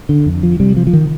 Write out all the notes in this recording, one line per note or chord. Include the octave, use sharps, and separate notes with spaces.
D3
F2
F3
C3 G3
F3
F3
D#3